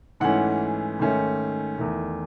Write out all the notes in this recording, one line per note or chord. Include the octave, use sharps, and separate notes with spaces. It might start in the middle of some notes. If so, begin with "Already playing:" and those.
G#2 E3 A3 C#4 F#5
G#2 D#3 A3 C#4
E2 D#3 A3